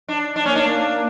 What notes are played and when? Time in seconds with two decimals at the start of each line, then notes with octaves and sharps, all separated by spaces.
0.08 D4
0.36 D4
0.45 A#3 C#4
0.55 D4
0.63 A#3